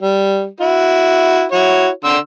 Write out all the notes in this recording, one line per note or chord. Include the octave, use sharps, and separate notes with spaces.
G3
E4 F#4
E4 F#4 C#5
D3 C6 E6